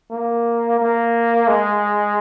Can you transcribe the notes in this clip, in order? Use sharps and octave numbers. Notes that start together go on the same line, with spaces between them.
A#3
A#3
G#3